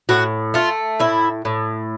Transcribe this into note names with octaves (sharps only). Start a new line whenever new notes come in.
A2 F#4
A3 F4
A2 E4
A2